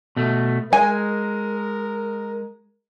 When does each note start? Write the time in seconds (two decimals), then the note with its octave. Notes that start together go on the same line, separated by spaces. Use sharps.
0.17 B2 A3
0.73 G#3 A#4 G#5